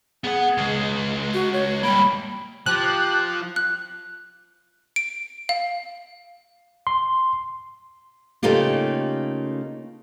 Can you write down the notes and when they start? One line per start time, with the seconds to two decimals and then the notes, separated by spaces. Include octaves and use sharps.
0.24 B3 G#4 F#5
0.58 C#2 G#3
1.34 F#4
1.53 C#5
1.83 G3 A#3 B5
2.66 F3 G4 G5 A5 F#6
3.56 F#6
4.96 D7
5.49 F5
6.87 C6
8.43 C#3 A3 A#3 D#4 F4 G4